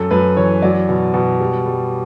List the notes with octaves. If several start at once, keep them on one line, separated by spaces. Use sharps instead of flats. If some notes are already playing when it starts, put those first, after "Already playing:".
Already playing: F#2 A4
F#2 B4
E3 C#5
F#3 D5
B2
B2
G3
G3